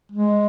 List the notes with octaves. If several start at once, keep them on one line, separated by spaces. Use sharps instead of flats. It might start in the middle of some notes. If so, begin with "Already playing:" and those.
G#3